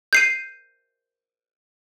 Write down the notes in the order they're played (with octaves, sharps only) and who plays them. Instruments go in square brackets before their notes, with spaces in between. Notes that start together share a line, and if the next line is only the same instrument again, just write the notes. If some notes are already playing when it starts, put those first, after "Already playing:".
[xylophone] G6 C7 D#7